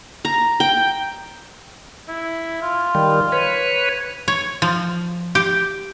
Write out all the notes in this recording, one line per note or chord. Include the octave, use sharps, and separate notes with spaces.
A#5
G5
E4
F4
D#3 G3
B4 C#5
C#5
F3
G4